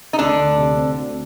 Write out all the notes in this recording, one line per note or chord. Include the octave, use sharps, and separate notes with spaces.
D#4
D2 D3 D4
D2
C3
C4
D2